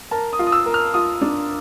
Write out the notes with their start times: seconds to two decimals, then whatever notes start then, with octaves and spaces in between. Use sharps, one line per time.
0.11 A#4 A5
0.33 D#6
0.39 F4
0.47 D#6
0.52 E6
0.66 A#4
0.74 F6
0.94 F4 D#6
1.21 D4